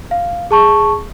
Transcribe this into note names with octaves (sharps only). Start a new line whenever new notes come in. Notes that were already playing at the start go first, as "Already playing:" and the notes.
F5
G#4 A5 C#6